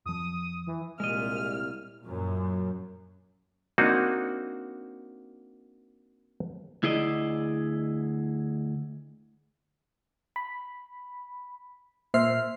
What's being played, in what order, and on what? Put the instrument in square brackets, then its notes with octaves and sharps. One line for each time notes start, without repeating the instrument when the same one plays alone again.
[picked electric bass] F2 F3 [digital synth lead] D#6
[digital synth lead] E3
[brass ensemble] C2 [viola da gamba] A#2 [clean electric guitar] G#3 D#5 [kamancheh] F6
[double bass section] F#2 A#2
[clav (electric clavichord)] A#3 C4 D4 D#4 F#4
[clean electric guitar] D2 E4 G#4 D5 D#5
[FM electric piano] B5
A#2 C5 E5 F6 C7